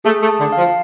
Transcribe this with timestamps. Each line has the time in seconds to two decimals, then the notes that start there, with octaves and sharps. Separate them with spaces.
0.05 A3 G#4
0.22 A3
0.29 A5
0.41 D3
0.52 F5
0.58 F3